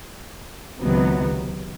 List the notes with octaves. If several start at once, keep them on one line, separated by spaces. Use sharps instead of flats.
C#2 C3 D#3 F#3 B3